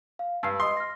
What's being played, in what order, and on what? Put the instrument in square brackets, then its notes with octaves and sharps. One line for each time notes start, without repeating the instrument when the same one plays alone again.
[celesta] F5
[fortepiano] G2 [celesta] E6 C7
[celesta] D#5 D#6 [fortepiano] C6
[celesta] F6 A#6